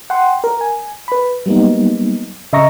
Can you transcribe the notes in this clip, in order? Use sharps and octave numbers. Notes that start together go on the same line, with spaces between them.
F#5 G5 C6
A#4
G#5
B4 B5
F#3 G3 A#3 B3 D#4
C#3 D#5 E5 A#5 C#6 A#6